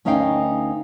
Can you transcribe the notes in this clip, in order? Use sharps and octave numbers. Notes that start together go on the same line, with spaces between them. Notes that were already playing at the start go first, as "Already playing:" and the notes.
D2 C#4 D#4 A#4 F5 G5